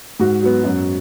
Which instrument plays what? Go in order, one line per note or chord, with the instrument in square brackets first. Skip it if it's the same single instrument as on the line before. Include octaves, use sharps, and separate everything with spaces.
[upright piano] G#2 F#4
F#3 B3
F#2